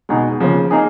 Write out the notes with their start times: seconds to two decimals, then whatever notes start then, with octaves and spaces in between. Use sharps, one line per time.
0.09 B2 G#3 D#4 G#4
0.40 C#3 F3 A#3
0.71 A#3 D#4 G#4